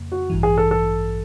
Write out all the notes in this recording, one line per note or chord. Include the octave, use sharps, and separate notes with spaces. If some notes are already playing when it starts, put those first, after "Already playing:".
Already playing: F2 C#3 A#3
F#4
A1 G2 E3
G#4
A4
A4